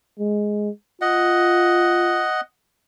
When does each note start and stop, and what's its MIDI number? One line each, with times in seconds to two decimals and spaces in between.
0.19 0.70 56
1.01 2.25 65
1.01 2.41 75
1.01 2.41 78